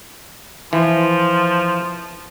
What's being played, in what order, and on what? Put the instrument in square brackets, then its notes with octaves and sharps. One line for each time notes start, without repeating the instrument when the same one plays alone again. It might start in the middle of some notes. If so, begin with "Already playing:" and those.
[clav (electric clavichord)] E3 [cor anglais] F3